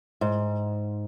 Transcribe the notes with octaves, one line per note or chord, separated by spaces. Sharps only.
G#2